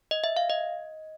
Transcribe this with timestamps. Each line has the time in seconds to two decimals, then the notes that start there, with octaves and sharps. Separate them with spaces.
0.11 D#5
0.24 E5
0.37 F5
0.50 D#5